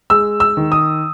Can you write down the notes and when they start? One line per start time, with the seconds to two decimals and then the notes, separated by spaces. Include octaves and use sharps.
0.10 G#3 E6
0.40 E6
0.57 D#3
0.72 D#6